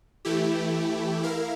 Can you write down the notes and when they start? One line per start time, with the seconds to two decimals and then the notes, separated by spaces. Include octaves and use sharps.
0.25 E3 A3 E4 G4
1.23 E4 A#4 F5